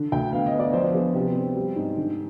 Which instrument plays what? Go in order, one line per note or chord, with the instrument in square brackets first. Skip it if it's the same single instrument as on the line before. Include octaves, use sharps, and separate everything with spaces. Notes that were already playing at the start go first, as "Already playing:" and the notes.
Already playing: [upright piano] D3
D2 G5
B3 F5
D#5
B3
D5
F3 C5
B3 G#4
C3 G4
C4
G3
G#2
D3